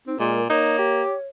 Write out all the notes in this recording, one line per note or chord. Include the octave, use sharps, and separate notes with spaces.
C4 D#4
A#2 G#3 A#4
A#3 D#4 C#5
G4